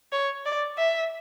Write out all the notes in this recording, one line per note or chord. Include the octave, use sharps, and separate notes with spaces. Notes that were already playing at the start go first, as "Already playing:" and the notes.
C#5
D5
E5